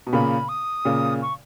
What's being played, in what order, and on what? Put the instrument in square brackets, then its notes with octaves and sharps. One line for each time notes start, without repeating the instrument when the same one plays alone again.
[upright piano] B2
[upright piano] A#2 C#3 [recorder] B5
[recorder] D#6
[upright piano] A#2 C#3
[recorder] C#6